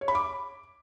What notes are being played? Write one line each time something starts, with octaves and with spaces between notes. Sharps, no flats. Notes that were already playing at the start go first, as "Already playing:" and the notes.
C#5
B5
D6